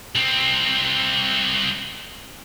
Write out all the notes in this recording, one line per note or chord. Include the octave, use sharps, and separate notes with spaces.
C2 C4